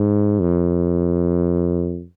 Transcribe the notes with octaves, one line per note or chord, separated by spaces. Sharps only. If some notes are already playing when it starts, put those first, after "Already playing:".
Already playing: G#2
F2